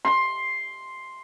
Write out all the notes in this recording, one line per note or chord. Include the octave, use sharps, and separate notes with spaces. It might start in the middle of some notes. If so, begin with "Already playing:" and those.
C6